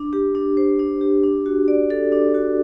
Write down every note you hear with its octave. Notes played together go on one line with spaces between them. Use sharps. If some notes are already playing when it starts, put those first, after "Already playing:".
Already playing: D4
G4
D4
C5
D4
G4
D4
F#4
D5
A4
D4
F#4